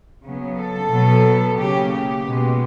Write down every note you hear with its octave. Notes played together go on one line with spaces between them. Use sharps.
C#3 F#3 B3
A4
B2 F#3 B3
C#3 F#3 A#3 G4
G4
B2 G#3 B3